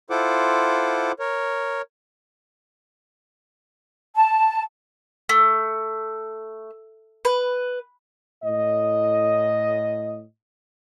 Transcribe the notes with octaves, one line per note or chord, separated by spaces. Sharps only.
E4 F4 A4 C5 F#5 D6
A#4 C#5
A5
A3
B4
A2 D#5